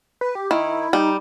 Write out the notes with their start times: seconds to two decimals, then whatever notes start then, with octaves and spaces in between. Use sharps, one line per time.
0.21 B4
0.35 G4
0.51 D#3 E4
0.93 G3 D#4